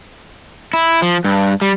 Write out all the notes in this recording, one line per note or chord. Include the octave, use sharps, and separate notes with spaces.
E4
F3
G2
G3